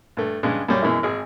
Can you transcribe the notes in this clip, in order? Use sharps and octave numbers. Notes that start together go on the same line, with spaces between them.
G2 A3
G2 C#3 G#3
F#2 C#3 G3 C#4
F#2 B2 E3 G#3 E4
G#1 G#4